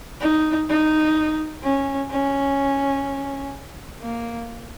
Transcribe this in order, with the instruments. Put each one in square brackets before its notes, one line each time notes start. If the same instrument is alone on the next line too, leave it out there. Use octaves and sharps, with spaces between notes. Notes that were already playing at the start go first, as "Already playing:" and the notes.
[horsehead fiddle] D#4
D#4
C#4
C#4
A#3